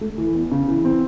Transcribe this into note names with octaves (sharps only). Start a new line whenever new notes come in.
A3
E3
E2
C#3
E3
C4